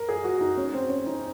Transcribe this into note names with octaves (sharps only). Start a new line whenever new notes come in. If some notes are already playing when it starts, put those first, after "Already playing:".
Already playing: A#4
G#4
F#4
D#4
C#4
C4
C#4
D#4